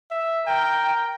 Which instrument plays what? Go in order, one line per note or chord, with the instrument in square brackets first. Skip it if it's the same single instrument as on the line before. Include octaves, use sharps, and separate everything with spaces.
[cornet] E5
[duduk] A#4 [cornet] G5